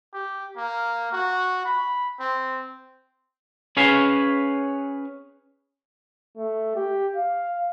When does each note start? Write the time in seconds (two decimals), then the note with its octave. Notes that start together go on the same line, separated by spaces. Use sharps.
0.14 G4
0.57 A#3
1.13 F#4
1.65 B5
2.19 C4
3.77 C#4 G#4 B4 C#5 F5
6.37 A3
6.76 G4
7.16 F5